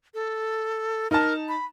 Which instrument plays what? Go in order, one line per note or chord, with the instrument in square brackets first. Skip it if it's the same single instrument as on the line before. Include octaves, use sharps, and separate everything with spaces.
[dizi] A4
[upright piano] D#4 A5 [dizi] A#4
[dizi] B5